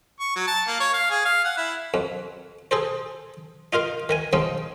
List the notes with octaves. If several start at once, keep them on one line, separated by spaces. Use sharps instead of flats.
C#6
F#3
A5
A#3
C#5
F5
G#4
F5
F#5
E4
F2
G#4 A4 C5
D#4 F4 A#4 F5
D#3 A#4 G#5
F3 G#3 C4 C#4 D#4